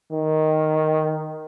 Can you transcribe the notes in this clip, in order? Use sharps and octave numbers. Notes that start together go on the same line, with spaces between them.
D#3